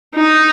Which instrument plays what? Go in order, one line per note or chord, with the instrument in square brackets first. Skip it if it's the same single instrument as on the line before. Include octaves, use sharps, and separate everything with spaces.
[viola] D#4